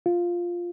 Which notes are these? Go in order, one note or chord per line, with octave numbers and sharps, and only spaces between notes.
F4